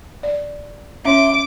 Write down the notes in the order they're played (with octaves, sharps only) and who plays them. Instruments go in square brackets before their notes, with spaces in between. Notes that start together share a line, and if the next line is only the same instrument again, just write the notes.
[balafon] D5
[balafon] C#4 C#5 [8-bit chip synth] E5 C6 [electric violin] D6